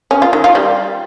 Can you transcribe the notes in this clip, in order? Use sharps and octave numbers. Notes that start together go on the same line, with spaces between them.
C#4
F4
D#3
F4
G3